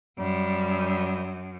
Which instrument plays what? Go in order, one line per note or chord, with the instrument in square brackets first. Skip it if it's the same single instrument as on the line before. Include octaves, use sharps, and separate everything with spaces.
[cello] F#2 [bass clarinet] G3